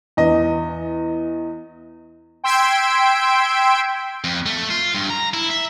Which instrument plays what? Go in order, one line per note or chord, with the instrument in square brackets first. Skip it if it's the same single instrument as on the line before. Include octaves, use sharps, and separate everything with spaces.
[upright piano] E2 D#5
[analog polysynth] G5 C6 E6 G#6 B6 D7
[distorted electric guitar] F2
A3
F4
G2
A#5
E4
E5